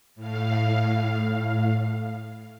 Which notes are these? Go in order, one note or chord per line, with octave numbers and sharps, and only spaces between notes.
A2 F5